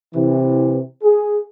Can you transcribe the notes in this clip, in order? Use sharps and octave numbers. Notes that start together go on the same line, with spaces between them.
C3 E3
G#4